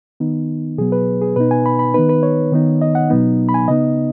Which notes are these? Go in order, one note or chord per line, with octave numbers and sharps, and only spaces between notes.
D#3 B3 D#4
B2 F#3 B3 G#4
B4
G#4
B2 B3 D#4 B4
G#5
B5
B5
D#3 B3 D#4 B4
B4
C#5
D#3 B3 D#4
D#5
F#5
B2 F#3 B3 D#4
B5
G#5
C#3 B3 D#4 D#5